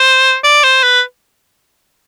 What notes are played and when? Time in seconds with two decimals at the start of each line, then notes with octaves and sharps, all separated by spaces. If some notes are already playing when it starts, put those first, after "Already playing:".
Already playing: C5
0.44 D5
0.64 C5
0.83 B4